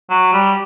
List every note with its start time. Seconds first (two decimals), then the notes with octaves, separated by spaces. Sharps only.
0.10 F#3
0.33 G3